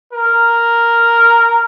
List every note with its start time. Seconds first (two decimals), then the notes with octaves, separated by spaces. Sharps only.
0.13 A#4